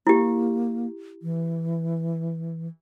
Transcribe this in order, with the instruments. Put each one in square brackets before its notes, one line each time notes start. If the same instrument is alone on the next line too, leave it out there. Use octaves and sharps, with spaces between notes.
[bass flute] A#3 [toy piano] E4 G4
[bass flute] E3